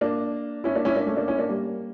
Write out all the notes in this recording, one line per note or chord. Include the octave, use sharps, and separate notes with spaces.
A#3 D4
C#4 E4
A#3 D4
C#4 E4
A#3 D4
A3 C#4
A#3 D4
C#4 E4
A#3 D4
G3 A#3